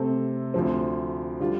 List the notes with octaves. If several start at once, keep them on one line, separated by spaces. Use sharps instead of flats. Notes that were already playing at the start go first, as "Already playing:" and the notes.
Already playing: C3 A3 C4 A4
D2 D3 F3 C4
D3 G3 F4